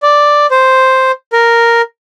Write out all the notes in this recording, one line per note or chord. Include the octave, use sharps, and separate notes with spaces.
D5
C5
A#4